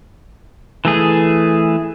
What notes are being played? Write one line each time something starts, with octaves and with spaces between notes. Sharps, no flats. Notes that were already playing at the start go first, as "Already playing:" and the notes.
E3 A3 G#4